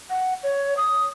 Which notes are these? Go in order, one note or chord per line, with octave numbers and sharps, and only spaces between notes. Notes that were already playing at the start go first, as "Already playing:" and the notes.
F#5
C#5
D#6